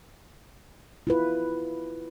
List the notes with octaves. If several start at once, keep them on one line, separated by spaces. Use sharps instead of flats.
E4 F4 B4